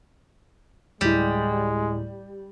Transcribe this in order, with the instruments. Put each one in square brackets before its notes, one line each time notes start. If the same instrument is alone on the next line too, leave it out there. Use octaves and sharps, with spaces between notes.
[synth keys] D2 A2 E4 [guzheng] G3 [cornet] G#3